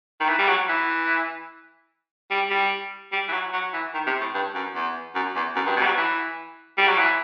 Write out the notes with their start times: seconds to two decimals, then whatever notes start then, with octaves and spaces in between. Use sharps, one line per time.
0.20 D#3
0.28 E3
0.38 G3
0.48 F#3
0.69 E3
2.31 G3
2.50 G3
3.12 G3
3.28 E3
3.33 F#3
3.53 F#3
3.73 E3
3.94 D#3
4.07 C3
4.21 A2
4.34 G2
4.55 F#2
4.75 E2
5.15 F#2
5.35 E2
5.56 F#2
5.66 G2
5.76 B2
5.82 G3
5.86 F#3
5.97 E3
6.78 G3
6.88 F#3
6.98 E3